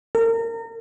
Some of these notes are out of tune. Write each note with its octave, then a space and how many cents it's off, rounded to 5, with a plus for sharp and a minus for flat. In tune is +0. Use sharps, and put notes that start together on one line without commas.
A#4 -30